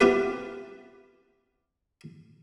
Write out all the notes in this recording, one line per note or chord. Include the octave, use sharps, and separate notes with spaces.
B3 C4 E4 F4 G4 B4